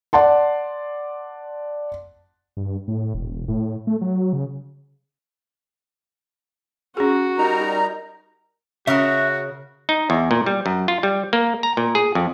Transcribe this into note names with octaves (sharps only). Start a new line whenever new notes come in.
D5 F#5 A5 C6
G2
A2
E1
A2
A3
F#3
C#3
C#4 F#4 G#4
G3 D#4 A#4 A#5
C#3 F#4 A#4 E5
D#4
E2
A#2
G3
F#2
F4
G3
A#3
A#5
A#2
G#4
F2